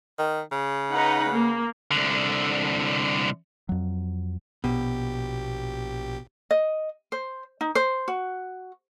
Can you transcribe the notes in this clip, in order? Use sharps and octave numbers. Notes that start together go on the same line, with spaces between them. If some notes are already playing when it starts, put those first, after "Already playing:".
D#3
C#3
D#4 B4 F#5
A#3
C2 D3
F2 F#3
A#1 B2 G4
D#5
C5
D#4
C5
F#4